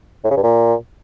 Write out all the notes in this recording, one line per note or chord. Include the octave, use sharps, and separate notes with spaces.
A2
C#3
G2
A#2